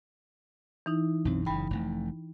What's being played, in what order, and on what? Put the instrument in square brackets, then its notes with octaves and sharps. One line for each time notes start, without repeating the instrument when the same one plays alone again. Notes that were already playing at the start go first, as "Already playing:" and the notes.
[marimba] E3 D#4 E4
[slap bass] B1 F#2 C4
[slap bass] F#1 C#3 [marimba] G5 B5
[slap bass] F1 A2 A3